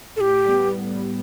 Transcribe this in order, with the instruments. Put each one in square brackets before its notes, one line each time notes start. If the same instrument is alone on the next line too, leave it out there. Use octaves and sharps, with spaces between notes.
[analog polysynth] A2 [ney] G4 A4
[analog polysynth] G3 B3